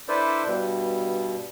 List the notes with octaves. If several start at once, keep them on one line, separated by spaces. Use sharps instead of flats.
D4 E4 A4 B4 C5 D5
G2 B2